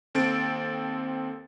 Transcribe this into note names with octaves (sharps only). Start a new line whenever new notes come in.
D#2 C4 A4 A6 D7